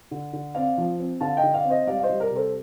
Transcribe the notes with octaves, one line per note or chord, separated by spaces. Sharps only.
D3
D3
C4 D5 F5
F3
C4
D3 F5 A5
D#5 G5
D3
D5 F5
C4
C5 D#5
G3 D5 F5
F5
C5 D#5
G3
A#4 D5
C3
A4 C5